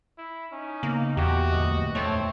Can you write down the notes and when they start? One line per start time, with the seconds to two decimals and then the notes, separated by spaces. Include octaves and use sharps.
0.18 E4
0.52 C#4 D#4
0.83 C#3 A#3 B3
1.17 E2 A#2 F#4 G4
1.52 D1 A#1 A3 D#5
1.95 D#1 F2 G#2 A3 C4 C#5